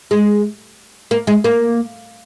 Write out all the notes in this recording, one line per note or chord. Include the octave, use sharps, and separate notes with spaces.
G#3
A#3
G#3
A#3